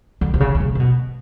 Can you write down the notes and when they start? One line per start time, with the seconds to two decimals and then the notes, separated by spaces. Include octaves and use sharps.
0.21 D3
0.34 C3
0.40 C#3
0.55 C#3
0.60 C3
0.75 C3
0.80 B2